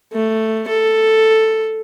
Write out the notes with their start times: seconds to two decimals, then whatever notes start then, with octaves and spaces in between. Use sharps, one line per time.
0.13 A3
0.68 A4